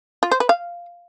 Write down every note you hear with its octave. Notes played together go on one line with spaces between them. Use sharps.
F4
C5
B4
F5